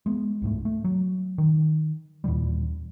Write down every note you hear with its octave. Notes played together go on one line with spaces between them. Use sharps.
G#3 B3
C2 G#2 A3
A3
F#3
D#3
D#2 A#2 E3 G3